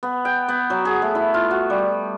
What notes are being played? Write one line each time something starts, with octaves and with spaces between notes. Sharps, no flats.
B3
G5
B3
F#3
G#4
A3
E4
F4
F#4
G3